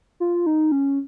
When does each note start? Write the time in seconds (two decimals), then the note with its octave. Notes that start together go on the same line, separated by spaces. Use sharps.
0.20 F4
0.46 D#4
0.72 C#4